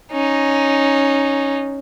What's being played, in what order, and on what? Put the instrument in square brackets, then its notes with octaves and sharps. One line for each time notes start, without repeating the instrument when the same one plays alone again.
[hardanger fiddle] C#4 D#4